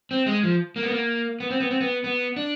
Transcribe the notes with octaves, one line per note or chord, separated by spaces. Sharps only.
C4
G#3
F3
A#3
B3
A#3
B3
C4
B3
C4
B3
B3
D4